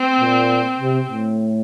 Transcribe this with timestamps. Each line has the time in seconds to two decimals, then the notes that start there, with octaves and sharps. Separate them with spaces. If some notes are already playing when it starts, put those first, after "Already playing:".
Already playing: C4
0.21 A#2
0.79 C3
1.08 A2